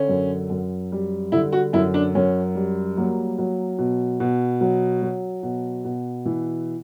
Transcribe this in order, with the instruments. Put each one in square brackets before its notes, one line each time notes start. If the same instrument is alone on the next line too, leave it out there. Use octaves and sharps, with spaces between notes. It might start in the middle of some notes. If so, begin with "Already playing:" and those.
Already playing: [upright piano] D3 C#4
F#2
F#2
G3
D3 E4
F#4
F#2 E4
D4
F#2 C#4
G3
F#3 A#3
F#3
B2
B2
F#3
F#3
B2
B2
E3